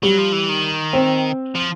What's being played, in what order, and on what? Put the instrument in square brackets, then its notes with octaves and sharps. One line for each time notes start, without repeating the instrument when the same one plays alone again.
[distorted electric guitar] F#3 [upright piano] G3
[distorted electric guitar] F3
E3
D#3
[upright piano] C4
[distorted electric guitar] F3